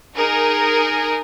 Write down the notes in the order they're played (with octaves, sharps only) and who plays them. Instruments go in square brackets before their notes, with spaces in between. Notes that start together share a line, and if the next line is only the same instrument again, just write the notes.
[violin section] D#4 G#4 A#4